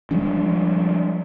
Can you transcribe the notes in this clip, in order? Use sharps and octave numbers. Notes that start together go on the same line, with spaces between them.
F3 G3 G#3 D4